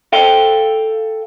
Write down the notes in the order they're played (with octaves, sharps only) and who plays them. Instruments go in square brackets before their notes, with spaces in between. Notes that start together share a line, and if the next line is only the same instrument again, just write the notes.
[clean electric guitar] A4 F5 G5